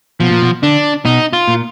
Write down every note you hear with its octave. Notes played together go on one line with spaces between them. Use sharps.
B2 F3
A#2
B2
D3 D4
B2 D#4
F4
A#2